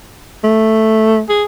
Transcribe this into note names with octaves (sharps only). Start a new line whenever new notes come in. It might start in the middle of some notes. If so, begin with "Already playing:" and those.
A3
G#4